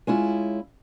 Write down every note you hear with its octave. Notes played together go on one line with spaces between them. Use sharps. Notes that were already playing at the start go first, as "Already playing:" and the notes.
G#3 C#4 E4 F4